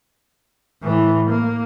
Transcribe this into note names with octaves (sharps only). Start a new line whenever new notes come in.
A2 E3
A#3